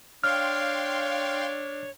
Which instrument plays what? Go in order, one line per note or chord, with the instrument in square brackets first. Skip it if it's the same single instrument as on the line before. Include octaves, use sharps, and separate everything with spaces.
[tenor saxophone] D4 [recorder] C#5 [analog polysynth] F5 G5 C6 [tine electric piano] F6